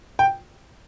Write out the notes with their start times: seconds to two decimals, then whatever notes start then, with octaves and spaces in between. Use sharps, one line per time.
0.19 G5